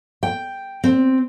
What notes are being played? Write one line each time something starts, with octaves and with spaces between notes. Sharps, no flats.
G5
C4